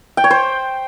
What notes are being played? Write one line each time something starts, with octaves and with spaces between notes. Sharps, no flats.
G5
C#5
C5